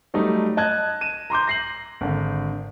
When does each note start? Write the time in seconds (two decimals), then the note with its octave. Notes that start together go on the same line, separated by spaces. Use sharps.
0.14 F#3 G3 A3 D#4
0.57 D#5 A5 F#6 G#6
1.01 D#7 E7
1.30 A#5 C6 D6 G6
1.47 A#6 C7 F#7
2.01 G#1 D3